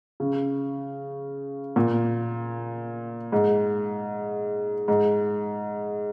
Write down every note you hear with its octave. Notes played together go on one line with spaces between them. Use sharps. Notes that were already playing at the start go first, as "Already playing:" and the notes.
C#3
A#2
G#2
G#2